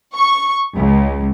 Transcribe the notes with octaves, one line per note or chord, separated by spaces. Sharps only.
C#6
C#2